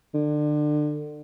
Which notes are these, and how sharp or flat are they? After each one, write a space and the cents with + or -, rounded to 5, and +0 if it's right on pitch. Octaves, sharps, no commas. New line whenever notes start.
D3 +30